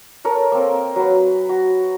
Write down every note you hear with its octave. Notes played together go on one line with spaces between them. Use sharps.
A4 A#4 C#5
A#3 C4
F#3 B4
F#4